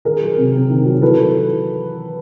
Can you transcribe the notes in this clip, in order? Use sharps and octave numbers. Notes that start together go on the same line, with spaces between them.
D#3 G#4 A#4
F#3
C3
C3
D#3
F#3
E3 A4 B4